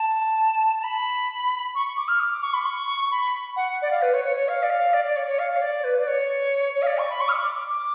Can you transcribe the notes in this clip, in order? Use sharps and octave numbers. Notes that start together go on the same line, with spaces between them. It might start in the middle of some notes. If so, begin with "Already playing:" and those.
Already playing: A5
A5
B5
C#6
D6
F6
D6
D6
C#6
B5
C#6
B5
F#5
D5
F5
B4
C#5
C#5
C#5
F5
D5
F5
D5
D5
C#5
C#5
F5
C#5
D5
B4
D5
C#5
C#5
F5
D5
C#6
B5
C#6
F6
D6
D6
D6